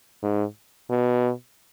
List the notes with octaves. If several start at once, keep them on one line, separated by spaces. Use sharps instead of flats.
G#2
B2